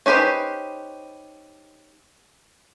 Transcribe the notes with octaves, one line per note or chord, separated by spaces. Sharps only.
C#4 D#4 G4 B4 C5